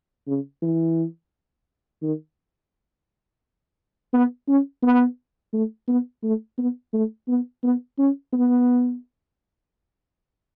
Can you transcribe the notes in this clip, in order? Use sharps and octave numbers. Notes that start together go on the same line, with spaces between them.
C#3
E3
D#3
B3
C#4
B3
A3
B3
A3
B3
A3
B3
B3
C#4
B3